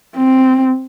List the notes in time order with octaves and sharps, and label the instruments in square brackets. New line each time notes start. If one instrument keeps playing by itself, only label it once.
[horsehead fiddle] C4